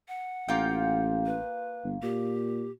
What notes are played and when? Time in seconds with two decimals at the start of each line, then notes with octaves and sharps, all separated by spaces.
0.08 F#5
0.48 A1 A#3 F4 G5
1.26 B4
1.84 G1
2.02 A#2 G4